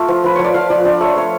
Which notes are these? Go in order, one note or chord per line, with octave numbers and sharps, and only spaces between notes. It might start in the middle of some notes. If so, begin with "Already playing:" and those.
Already playing: A3 F4
F3
F3 B4
F3 C#5
D5
F3 F5
F3 D5
D4 D5
A3 C#5
A3 C#5